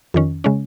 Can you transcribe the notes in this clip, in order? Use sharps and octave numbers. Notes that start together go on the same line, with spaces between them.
F2 D#3 C#4
C#3 G#3 C#4